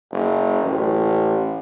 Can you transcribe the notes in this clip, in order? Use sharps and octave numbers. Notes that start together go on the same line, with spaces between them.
F#1
A1